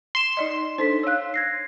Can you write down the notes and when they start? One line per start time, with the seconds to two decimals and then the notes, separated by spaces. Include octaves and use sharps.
0.15 C6 E7
0.37 D#4 D5 D#5
0.78 D4 D#4 A4 C5 B6
1.03 C#5 F5 E6 F#6
1.34 G#6 A#6 C7